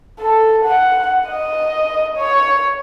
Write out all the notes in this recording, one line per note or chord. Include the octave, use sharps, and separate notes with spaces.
A4
F#5
D#5
C#5